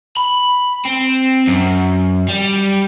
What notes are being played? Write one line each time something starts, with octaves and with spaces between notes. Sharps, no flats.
B5
C4
F#2
G3